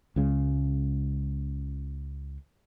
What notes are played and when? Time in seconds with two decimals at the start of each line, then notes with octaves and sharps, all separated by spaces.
0.16 C#2 C#3 G#3